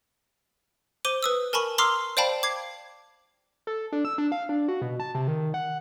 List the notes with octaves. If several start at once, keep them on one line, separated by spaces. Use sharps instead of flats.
C5 D6 D#7 G7
B4 D#6 E6
A#4 G#5 A5 B5 C#6 F#7
A#5 C6 D6 E6 F6 C7
C5 D5 F5 G5 A5 B5
D6 G#6 C7
A4
D4
E6
D4
F5
D4
F#4
B2
A5
C3
D#3
F#5